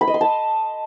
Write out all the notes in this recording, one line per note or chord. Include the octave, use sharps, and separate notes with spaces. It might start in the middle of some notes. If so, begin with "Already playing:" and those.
B5
D#5
C6
A5